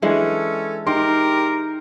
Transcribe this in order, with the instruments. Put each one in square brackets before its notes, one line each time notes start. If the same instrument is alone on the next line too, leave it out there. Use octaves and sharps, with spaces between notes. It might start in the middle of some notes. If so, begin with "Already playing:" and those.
[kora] E3 G#3 D4 [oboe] C#4 [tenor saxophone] A4
[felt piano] D#4 C6 [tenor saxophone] G4 [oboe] A#4